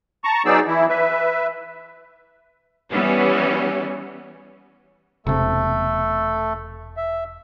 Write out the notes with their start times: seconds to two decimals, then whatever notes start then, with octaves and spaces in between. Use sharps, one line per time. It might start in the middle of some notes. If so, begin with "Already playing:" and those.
0.24 A5 A#5 C#6
0.46 F#3 B3 D#4 G#4 D5 E6
0.67 E3 E4
0.89 B4 E5
2.92 E3 G3 B3 C#4
5.27 E1 C3 A3 A4
6.97 E5